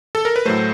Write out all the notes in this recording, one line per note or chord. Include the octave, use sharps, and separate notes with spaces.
A4
A#4
B4
A2 F#3 A3 C5